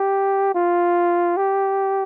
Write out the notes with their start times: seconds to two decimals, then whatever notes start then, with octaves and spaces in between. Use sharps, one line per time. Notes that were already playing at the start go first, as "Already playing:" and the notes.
Already playing: G4
0.55 F4
1.37 G4